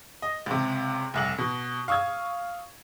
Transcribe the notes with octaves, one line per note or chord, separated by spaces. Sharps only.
D#5
C#2 C3
F1 C2 F#7
B2
F5 C#6 D#6 E6 G#6